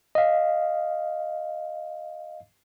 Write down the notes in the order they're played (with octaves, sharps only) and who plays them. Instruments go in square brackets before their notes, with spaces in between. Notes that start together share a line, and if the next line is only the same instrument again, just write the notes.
[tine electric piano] D#5 F5